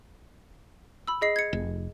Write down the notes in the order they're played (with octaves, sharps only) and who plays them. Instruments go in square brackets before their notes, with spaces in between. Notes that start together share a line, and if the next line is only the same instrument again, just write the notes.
[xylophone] B5 E6
G#4 D#5 C7
G#6 C#7
[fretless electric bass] F1